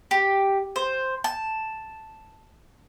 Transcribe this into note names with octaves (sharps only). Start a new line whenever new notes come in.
G4
C5
A5